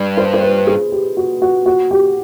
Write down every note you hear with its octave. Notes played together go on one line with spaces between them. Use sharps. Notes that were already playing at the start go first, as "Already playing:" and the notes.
Already playing: G2
C5
C5
B4
G#4
G4
F#4
F#4
F#4
G4